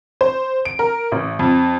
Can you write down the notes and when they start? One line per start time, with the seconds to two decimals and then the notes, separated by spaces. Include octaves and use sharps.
0.21 C5
0.65 D7
0.79 A#4
1.12 A1
1.39 F2